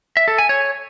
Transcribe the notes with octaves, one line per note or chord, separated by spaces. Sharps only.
E5
A4
G#5
C#5